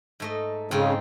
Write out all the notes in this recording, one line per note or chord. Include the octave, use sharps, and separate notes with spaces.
G#2 A3 D#5
G#2 C#3 C4 F4